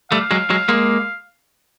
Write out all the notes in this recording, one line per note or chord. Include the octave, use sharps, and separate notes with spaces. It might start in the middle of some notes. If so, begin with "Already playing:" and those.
G3 A3 F5
F#3 G#3
F#3 G#3
G#3 A#3